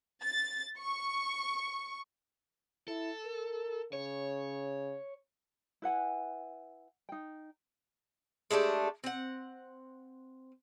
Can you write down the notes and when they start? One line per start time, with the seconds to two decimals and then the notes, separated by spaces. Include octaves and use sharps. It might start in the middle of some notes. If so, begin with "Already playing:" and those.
0.22 A6
0.79 C#6
2.88 E4 A4
3.26 A#4
3.93 C#3 C#5
5.82 E4 B4 F#5 G#5
7.09 D#4 G5
8.51 G#3 A3 D4 G4
9.04 C4 F#5